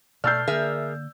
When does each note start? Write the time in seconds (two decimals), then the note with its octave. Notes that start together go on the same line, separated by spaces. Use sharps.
0.24 B2 A3 D5 E6 F6 G6 A6 C7
0.47 D3 A#3 G#4 A#4 E5